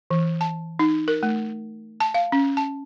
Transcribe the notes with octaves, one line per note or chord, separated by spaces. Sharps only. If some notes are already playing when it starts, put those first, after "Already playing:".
E3
A5
D#4
A#4
A3
A5
F5
C#4
A5